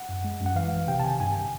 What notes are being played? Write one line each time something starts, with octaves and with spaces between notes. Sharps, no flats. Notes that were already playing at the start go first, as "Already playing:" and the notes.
Already playing: F#5
F#2
G#3
F#2
F#5
E3 F5
A1
C3 G5
A5
D#3 G#5
G2 G#5